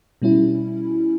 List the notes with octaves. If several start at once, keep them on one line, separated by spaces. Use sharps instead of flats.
B2 G3 C#4 E4